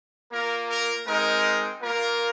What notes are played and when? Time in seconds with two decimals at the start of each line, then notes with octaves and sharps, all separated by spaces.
0.31 A#3 F4 A#4
0.68 A#4
1.06 G#3 C4 D#4 A#4
1.82 A#3 F4 A#4